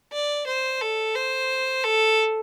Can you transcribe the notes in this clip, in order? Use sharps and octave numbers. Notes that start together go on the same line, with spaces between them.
D5
C5
A4
C5
A4